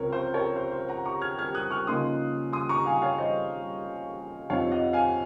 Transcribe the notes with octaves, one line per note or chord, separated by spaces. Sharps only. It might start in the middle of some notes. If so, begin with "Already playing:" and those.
Already playing: C#2 C3 F3 C4 A#4 C#5
C5
A#4 C#5
C5
C5
F#5 A#5
A#5 C#6
F6 G#6
F6 G#6
D#6 F#6
C#6 F6
C#3 F3 A#3 D#4 C6 D#6
C6 D#6
A#5 C#6
F5 G#5
C#5 F5
C5 D#5
F2 C3 F3 C4 D#4 C#5 F5
D#5 F#5
F5 G#5